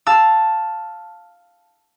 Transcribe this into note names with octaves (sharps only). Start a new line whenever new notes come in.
F5 A5 E6